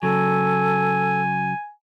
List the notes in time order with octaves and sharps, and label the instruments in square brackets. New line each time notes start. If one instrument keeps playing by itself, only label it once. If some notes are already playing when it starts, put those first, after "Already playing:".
[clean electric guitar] C#3 F#3 [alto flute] A4 [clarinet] G#5